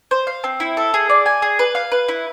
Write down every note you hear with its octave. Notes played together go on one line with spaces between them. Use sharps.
C5
F5
C4
E4
A4
G#4
D5
G#5
G#4
B4
F5
B4
E4